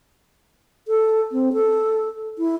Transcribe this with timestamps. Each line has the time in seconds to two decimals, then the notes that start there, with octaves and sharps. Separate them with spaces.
0.88 A4
1.32 C4
1.53 A4
2.38 E4